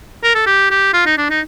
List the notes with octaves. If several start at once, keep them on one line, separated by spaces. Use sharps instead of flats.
A#4
A4
G4
G4
F4
D#4
D4
D#4